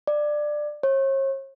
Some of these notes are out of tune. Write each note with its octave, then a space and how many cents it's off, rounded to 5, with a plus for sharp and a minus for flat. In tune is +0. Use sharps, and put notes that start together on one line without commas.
D5 +15
C#5 -40